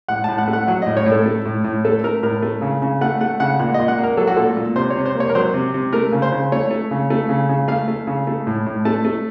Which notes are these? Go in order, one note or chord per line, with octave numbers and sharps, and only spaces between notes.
A2 F#5
A2 A5
F#5
A3
F#5
F#3 F#5
A2 D#5
C#5
A2
A4
A3
A2
A2
A3 A4
A3 A#4
A2 A#4
A3
C#3
C#3
A3 F#5
A3 F#5
C#3 F#5
A#2 F#5
A#2 D#5
F#5
A#3
A#4
F#3 A4
F#4
A#2 A4
A#2
C3 C5
C#5
C3
C5
A#3 C#5
A#4
F#3 C5
C3
C3
A3 A#4
C#3
C5
C#3
A3 C#5
A3
C#3
A3
C#3
C#3
A3 F5
A3
C#3
A3
A2
A2
A3 A5
A3